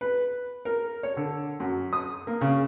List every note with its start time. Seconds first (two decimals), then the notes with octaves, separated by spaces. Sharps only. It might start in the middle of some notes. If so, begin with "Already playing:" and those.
0.01 B4
0.65 A#4
1.03 C#5
1.17 D3
1.60 F#2
1.93 D#6
2.27 A#3
2.41 C#3